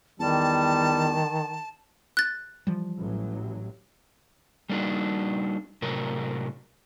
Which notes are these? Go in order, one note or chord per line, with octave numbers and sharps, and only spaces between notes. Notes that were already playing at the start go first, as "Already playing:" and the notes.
E2 D#3 G3 A5
F#6 A6
E3 F3 G3
A1 F#3
G3 A#3 D4 D#4 F#4
A2 C3 F#3 A#4